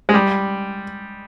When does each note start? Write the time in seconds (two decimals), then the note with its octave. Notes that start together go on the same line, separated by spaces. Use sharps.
0.09 G#3
0.14 G3